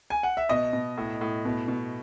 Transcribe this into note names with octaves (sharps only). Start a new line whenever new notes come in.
G#5
F#5
E5
B2 D#5
B2
A2
A2
B2
B2